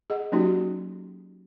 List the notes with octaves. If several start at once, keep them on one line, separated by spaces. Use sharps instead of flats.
G#4 D#5 F#5
F#3 A#3 C#4 D#4 F#4 G4